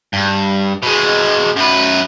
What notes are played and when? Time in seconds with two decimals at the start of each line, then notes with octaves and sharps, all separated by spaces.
0.13 G2
0.82 B2 G#3
1.56 F#2 B4